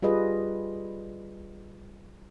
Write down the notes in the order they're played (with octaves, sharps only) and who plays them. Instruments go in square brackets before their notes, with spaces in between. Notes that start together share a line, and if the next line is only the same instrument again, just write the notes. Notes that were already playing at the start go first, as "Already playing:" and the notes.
[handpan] G3 F4 G#4 B4 D#5